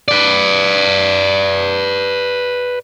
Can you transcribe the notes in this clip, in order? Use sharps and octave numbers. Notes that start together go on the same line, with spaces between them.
B4 D5